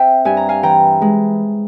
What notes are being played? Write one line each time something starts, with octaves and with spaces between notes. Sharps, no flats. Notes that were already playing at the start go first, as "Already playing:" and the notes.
Already playing: C4 E5 G5
G2 G#5
A#5
F5 G#5
E3 G5 A#5
G#3